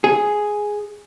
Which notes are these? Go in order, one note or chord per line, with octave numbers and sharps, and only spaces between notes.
G#4